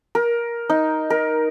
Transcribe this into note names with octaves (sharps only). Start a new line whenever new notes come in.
A#4
D#4
A#4